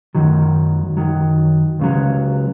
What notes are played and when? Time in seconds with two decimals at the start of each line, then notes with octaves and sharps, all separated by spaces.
0.15 F#2 D#3 F#3
0.97 F#2 D#3 F#3
1.80 C#2 C#3 F#3